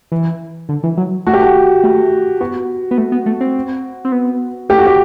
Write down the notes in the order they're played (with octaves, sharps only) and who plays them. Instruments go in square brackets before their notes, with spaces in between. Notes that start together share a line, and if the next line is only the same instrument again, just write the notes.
[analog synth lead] E3
D3
E3
F#3
[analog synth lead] A3 [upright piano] F#4
[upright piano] G4
F#4
[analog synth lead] A3
[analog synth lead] B3 [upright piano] F#4
[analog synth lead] B3
A3
B3
A3
C4
C4
B3
[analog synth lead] A3 [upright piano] G4
[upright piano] F#4
G4